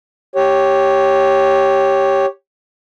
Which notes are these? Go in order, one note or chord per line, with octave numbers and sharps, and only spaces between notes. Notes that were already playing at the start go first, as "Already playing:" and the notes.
G4 C#5